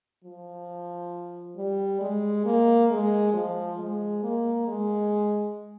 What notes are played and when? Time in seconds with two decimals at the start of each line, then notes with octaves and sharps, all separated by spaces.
0.24 F3
1.57 G3
2.01 G#3
2.45 A#3
2.90 G#3
3.34 F3
3.78 G#3
4.23 A#3
4.67 G#3